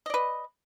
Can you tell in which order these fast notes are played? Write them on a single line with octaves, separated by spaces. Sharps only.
D#5 D5 B4